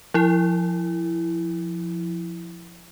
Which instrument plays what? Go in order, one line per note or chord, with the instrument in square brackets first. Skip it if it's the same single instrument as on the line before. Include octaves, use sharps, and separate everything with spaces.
[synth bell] F3 E4